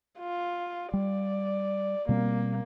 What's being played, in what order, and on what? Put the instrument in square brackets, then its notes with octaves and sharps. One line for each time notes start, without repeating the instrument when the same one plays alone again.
[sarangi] F4
[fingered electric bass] G3 [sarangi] D5
[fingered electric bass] B2 G3 C4 [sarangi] A#3